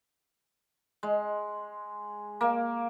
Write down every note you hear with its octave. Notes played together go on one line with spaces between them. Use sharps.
G#3
A#3